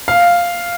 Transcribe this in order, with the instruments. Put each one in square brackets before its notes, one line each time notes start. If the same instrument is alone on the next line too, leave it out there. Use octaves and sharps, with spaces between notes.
[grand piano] F5